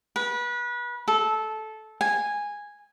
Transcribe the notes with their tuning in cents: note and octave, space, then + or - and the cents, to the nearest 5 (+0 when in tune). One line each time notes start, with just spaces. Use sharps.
B4 -30
A4 -15
G#5 -10